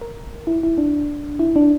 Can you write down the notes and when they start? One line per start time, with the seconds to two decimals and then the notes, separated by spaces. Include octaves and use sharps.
0.01 A#4
0.47 E4
0.63 E4
0.78 D4
1.39 E4
1.56 D4